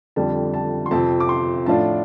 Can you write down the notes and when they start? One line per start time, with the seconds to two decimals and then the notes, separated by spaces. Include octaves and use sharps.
0.16 F2 D3 G3 A5
0.54 A5
0.86 C6
0.91 F2 C3 F3 C4 A5
1.20 D6
1.29 C6
1.66 A2 F3 D4 F4 A5